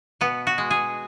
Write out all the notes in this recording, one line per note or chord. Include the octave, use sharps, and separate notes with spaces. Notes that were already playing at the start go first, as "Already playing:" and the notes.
B2 B3
F#4
G#3
G#4